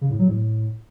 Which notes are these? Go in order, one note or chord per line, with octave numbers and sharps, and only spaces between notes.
C#3
A2
F#3
A2